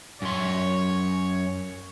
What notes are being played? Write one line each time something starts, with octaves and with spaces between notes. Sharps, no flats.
F#2 C#5 C6